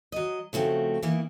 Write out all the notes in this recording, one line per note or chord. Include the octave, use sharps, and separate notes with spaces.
F#3 D#5
C#3 F3 A3 C4 F#4
E3 A#3 B3 D#4